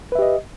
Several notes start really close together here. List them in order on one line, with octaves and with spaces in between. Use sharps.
B4 E5 G4 D#5